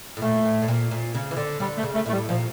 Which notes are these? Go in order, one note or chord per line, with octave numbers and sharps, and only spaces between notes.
A2
A#2 A3
A2
A2
A#2
A#2
C#3
E3
D3
D3 G3
A3
C#3
A3
A2 A3
G3
A#2 F3